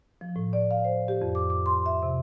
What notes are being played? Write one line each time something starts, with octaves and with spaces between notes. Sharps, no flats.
F3
A2
D5
F5
C5
G4
F2
D6
D6
C6
E5
C3